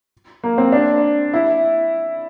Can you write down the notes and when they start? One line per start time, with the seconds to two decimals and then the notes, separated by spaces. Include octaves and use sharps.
0.44 A#3
0.58 C4
0.72 D4
1.34 E4